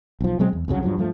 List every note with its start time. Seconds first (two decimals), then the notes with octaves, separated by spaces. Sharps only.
0.21 B1 F3
0.39 B2 F#3 G#3 C4
0.53 E2
0.68 C2 F#2 C#3 F#3
0.83 G2 F3 F#3
0.98 G2 F3 A3